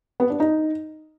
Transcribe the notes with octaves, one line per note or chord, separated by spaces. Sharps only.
B3
D4
D#4